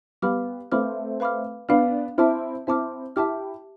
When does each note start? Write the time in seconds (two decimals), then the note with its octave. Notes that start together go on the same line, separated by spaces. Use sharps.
0.22 G3 B3 B4 F5 B5 D6 F6
0.72 A3 C4 B4 F5 B5 D6 F6
1.20 B4 F5 B5 D6 F6
1.69 B3 D4 B4 F5 B5 D6 F6
2.18 C4 E4 E5 A5 D6 F6
2.67 C4 E4 E5 A5 D6 F6
3.16 E4 G4 E5 A5 D6 F6